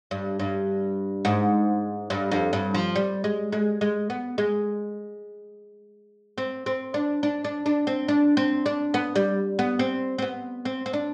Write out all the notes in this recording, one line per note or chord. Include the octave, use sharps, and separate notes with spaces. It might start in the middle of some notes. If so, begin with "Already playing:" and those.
G2
G2
G#2
G2
F2
G2
F3
G3
G#3
G#3
G#3
B3
G#3
C4
C4
D4
D4
D4
D4
C4
D4
C4
D4
B3
G3
B3
C4
C4
B3
C4
C4
D4